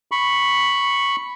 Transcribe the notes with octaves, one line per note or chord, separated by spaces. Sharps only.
B5 C#6